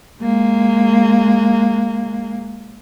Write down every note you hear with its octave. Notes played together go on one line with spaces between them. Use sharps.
G#3 A#3